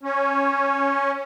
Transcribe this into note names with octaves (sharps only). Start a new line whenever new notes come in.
C#4